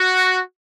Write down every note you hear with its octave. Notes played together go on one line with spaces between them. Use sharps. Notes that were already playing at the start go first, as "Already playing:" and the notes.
Already playing: F#4